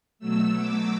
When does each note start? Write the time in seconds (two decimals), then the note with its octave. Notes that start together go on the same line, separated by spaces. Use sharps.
0.19 B2 F#3 A3 E6
0.55 D6